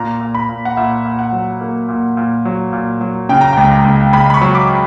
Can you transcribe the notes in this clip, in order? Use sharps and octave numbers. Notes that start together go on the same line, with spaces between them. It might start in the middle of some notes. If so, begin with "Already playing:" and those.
Already playing: A#2 A#5
A#2
B5
A#2
F#5
A#2 E5
A#2
F#5
F#3
A#3
A#2
A#2
F#3
A#2
F#3
C#3 G5
A#5
C#2 G5
A#5
C#2
C#2 B5
B5
C#6
F#3
D6